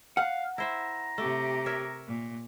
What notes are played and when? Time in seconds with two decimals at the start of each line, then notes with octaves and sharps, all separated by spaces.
0.17 F5 F#5
0.58 E4 C5 E5 A#5
1.18 C3 A3 G4
1.66 A#4 C#5 E5
2.08 A#2